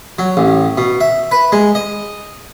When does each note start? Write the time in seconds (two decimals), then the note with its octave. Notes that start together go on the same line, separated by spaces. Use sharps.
0.19 F#3
0.37 A1
0.77 B2
1.01 E5
1.31 B4
1.52 G#3
1.75 D#5